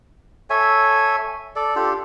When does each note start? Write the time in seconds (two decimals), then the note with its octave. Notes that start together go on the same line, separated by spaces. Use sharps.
0.50 A4 C#5 E5 G#5
1.56 A4 D5
1.76 D4 F4 G4 A4